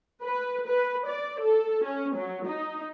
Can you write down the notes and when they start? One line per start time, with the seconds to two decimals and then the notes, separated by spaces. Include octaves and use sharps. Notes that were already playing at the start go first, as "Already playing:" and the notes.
0.23 B4
0.66 B4
1.07 D5
1.41 A4
1.84 C#4
2.16 F#3
2.46 D#4